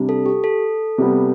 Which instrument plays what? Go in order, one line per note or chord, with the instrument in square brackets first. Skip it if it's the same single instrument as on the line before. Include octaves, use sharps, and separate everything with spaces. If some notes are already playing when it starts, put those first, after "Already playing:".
Already playing: [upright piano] C3 G3 D4
[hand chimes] A4
G4
A4
[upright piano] C3 G3 B3